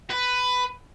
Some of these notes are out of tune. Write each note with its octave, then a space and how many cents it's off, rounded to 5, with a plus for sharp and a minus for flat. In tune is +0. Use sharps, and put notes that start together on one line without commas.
B4 +10